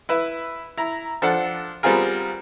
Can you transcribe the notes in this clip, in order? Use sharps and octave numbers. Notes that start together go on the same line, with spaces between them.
E4 B4 E5
E4 A#5
F3 D4 A4 F#5
G3 B3 C4 F4 G#4 A#4